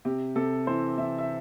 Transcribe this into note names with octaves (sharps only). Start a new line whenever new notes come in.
C3 G4
C3 A4
E3 C5
E3 E5
E5